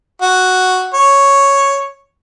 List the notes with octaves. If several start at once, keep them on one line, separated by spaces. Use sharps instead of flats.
F#4
C#5